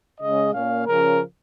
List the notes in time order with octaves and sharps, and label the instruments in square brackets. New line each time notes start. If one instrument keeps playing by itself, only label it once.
[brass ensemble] C#3 G#3 C#4 D#5
A#2 A#3 C#4 F5
C#3 F3 C#4 A#4